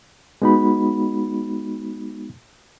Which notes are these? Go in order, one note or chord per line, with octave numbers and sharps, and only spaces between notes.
G#3 B3 D#4 F#4 B5